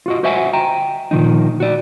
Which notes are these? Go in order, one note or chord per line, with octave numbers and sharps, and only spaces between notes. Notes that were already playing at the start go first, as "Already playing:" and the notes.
F4 F#4 D#5
F#4 C5 D#5 E5 F#5 G#5
G5 A#5
A#2 D#3 F3 D#4
F#4 D5